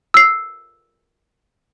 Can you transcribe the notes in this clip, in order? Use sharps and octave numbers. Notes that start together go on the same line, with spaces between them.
E6 C7